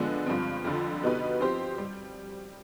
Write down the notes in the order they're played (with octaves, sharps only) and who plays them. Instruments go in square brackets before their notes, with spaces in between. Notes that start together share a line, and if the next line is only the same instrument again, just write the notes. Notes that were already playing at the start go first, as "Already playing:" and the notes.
Already playing: [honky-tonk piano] D3 F3 G#3 B3 D4
G2 F3 C4
F2 D3 F3
B2 B3 D#4 G4 B4
F3 C4 G4 C5
G3